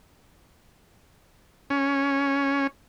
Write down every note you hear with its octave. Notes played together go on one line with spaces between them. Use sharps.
C#4